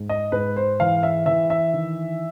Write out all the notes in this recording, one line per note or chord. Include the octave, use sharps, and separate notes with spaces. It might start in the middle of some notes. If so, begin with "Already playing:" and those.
Already playing: G#2
D#5
G#2 B4
C5
E3 F5
E5
E3 E5
E5
D#3